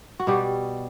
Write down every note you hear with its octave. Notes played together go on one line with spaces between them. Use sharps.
F#4
B2 G3 G4